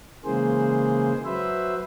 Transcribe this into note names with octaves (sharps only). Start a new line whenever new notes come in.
C#3 E3 G#3 A#3 G#4 C5
F#3 B4 C5 E5